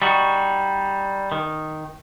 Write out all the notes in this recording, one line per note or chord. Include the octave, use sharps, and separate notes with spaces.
G3 D#4 F#4
D#3